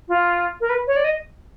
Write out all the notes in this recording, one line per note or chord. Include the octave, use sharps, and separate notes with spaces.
F4
A#4
B4
C#5
D5
D#5